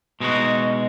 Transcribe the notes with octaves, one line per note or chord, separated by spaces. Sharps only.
B2 G#3 D#4 F#4